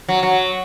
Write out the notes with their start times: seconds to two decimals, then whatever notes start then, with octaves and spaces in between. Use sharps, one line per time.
0.09 F#3
0.23 F#3